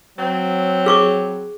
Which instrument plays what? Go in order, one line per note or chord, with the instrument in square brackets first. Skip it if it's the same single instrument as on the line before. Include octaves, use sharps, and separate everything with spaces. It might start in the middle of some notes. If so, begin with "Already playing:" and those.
[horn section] F#3 C4
[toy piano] G#4 C#6 D6